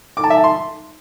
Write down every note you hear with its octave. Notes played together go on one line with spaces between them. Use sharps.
D6
A5
E5
A5
C6